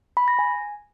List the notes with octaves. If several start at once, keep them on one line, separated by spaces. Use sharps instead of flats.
B5
A#6
G#5